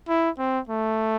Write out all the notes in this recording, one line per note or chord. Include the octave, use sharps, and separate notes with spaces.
E4
C4
A3